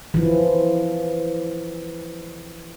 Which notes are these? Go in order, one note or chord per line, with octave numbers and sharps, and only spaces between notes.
E3 F3